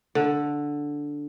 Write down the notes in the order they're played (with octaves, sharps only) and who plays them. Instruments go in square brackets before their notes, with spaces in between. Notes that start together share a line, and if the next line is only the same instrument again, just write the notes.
[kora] D3